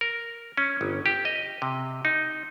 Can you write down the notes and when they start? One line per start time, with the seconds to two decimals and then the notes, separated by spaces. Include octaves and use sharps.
0.01 A#4
0.57 C#4
0.81 G1
1.06 G4
1.25 D#5
1.62 C3
2.05 D#4